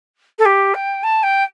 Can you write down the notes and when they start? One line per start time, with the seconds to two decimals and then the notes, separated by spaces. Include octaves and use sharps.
0.39 A4
0.46 G4
0.75 G5
1.04 A5
1.23 G5